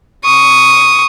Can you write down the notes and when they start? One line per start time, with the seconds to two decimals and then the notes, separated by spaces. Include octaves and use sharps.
0.25 C#6 D#6